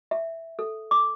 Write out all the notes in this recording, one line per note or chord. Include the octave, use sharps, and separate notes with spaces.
E5
A4
D6